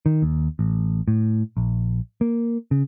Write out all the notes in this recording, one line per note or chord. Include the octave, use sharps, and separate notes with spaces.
D#3
D#2
A1
A2
A#1
A#3
C#3